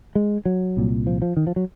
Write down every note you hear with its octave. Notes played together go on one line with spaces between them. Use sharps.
G#3
F#3
C2 A#2
F3
F3
D#3
F3
F#3